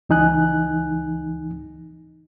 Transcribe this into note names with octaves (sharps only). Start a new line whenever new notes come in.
C#2 E3 D#4 G#5 F#6